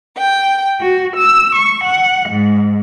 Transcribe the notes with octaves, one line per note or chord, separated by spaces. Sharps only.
G5
F#4
E6
C#6
F#5
G#2